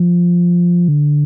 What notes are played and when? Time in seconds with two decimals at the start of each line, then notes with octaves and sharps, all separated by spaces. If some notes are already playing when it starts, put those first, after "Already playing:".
Already playing: F3
0.88 D3